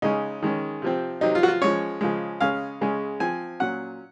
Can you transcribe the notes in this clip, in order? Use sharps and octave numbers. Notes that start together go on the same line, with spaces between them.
C#3 G#3 C#4 D#4
D#3 G#3 C#4
C3 F3 C4
C3 F#3 C4 D#4
F4
F#4
F4
F3 G#3 C#4 C#5
C#3 F3 G#3
C#3 G#3 C#4 F5
C#3 G#3 C#4
F3 C4 G#5
A#2 F#3 C#4 F#5